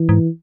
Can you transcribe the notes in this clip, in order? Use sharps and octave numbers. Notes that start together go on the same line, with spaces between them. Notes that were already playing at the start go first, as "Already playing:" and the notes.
Already playing: E3
G#2